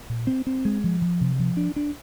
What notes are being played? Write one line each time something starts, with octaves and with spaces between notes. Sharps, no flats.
A#2
C4
C4
G#3
F3
F3
C3
F3
D4
D4